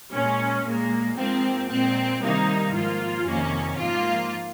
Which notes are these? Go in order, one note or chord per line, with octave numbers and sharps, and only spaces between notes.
A#2 G#3 C#4
A#2 G#3 A#3
G#2 F3 A#3 C4
A#2 G#3 C4
C3 D#3 G3 A#3 D#4
G#2 F3 A#3 F4
F2 C3 D#3 A#3 C#4
G#2 F3 A#3 F4